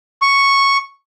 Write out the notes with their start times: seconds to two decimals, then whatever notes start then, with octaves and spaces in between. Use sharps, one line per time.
0.22 C#6